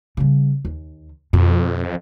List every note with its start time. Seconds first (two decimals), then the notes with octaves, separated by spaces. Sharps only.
0.17 C#3 G3
0.65 D#2
1.33 F2 B2